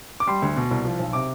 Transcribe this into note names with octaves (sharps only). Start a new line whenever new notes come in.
D6
G3 C6
D2
B2
C2
F3
B1
C3 D6